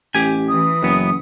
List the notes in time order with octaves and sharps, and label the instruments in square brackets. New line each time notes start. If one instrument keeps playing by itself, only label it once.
[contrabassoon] A1 [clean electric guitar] G4 G#5
[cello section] E3 [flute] D#6
[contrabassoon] F#1 [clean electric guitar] F#2 B3